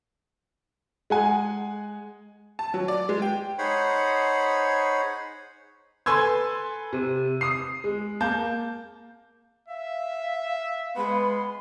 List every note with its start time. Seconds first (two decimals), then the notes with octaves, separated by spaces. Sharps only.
1.10 G#3 F#5 G#5
2.59 A5
2.74 F#3
2.88 D5
3.09 G#3
3.22 G5
3.58 D#4 G#4 C5 C#5 F#5 B5
6.06 A4 B4 G#5 C6 E6 G#6
6.93 C3
7.41 D#6 C7
7.84 G#3
8.21 A#3 A5 G6
9.68 E5 F5
10.96 G#3 B3 B5 C6